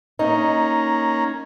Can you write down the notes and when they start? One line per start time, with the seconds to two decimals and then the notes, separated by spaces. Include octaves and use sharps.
0.19 A#3 C#4 D#4 A#5